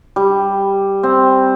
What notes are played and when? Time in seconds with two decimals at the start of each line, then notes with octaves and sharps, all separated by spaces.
0.16 G3
1.03 C4